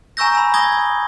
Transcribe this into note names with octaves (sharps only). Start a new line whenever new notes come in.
G#5 A#5 C#6 E6 G6 A#6
B5 E6
D#6 G#6 A#6 G7